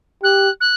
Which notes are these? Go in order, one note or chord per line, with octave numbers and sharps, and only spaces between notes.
G4 F#6
F#6